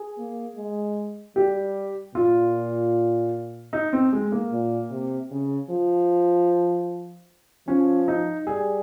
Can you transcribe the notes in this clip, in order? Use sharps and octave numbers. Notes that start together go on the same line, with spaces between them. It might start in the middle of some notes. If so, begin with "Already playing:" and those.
Already playing: G#4
A#3
G#3
G3 G4
A#2 F4
D#4
C4
G#3
A#3
A#2
C3
C#3
F3
F3 C#4
D#4
G3 G#4